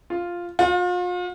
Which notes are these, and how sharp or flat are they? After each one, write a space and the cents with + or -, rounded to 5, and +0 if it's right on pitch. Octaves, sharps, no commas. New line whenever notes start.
F4 +0
F4 +40